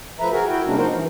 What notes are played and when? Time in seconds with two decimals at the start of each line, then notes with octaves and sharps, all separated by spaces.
0.20 F3 A3 B4 E5 A#5
0.32 F#4 G#4 A#4
0.48 E4 F#4 G5
0.66 C3 G3 G#3 A#3 C#4 D4
0.78 F3 D#4 F#4 A#4 C5
0.93 E3